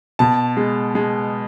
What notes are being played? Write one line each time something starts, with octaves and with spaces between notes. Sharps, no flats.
B2 A5
G#3
G#3